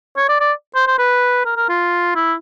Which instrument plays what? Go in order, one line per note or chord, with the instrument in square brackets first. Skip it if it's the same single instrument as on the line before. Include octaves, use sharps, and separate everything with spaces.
[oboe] C#5
D5
D5
C5
C5
B4
A#4
A#4
F4
E4